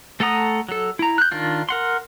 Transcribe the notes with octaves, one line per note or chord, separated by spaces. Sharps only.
A3 A4 F#5 A#5 D#6
F#3 A4
E4 A#5
F#6 G6
D#3 D4 F4
A#4 F#5 C6